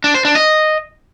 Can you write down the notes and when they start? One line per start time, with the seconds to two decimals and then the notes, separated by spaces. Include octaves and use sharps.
0.04 D4
0.14 C5
0.25 D4
0.35 D#5